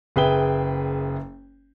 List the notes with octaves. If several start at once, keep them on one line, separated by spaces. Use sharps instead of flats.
F#1 G#4 B4 E5 G5 G7